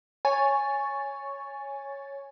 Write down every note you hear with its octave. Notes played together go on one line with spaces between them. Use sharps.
C#5 G#5 C#6 A6